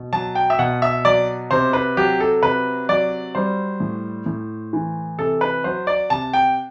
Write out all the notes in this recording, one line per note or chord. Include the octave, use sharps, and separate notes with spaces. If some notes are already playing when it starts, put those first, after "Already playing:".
Already playing: B2
F#3 A5
G5
E5
B2 F#5
E5
F#3 D5
C3 C5
B4
F#3 G4
A4
C3 B4
F#3 D5
G3 C5
A2
A2
E3
C3 A4
B4
F#3 C5
D5
C3 A5
G5